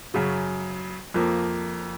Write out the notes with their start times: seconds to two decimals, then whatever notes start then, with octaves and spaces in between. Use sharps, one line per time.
0.14 F#2 C#3 F#3
1.14 F2 F3 A#3